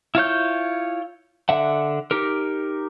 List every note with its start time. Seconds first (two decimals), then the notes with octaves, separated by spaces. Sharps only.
0.15 E4 F4 C#5 G6
1.49 D3 E5 F#5
2.11 D#4 G4 A#4